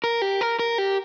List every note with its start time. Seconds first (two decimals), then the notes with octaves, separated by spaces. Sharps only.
0.04 A#4
0.22 G4
0.41 A#4
0.59 A#4
0.78 G4